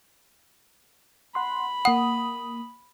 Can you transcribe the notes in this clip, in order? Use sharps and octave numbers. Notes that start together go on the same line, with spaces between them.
F#5 B5 C6
A#3 F#5 D#6